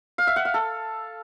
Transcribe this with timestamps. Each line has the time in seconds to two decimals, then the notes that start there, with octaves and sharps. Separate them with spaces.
0.18 F5
0.27 E5
0.36 F#5
0.45 F5
0.54 A4